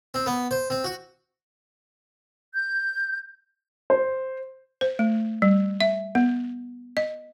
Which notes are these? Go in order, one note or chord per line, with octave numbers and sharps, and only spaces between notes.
C4
B3
C5
C4
F#4
G6
C5
C5
A3
G3
E5
B3
D#5